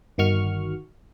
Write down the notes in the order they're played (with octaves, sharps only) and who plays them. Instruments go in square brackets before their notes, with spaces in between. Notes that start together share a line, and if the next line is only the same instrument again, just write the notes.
[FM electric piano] G1 D#3 F#4 C#6 F6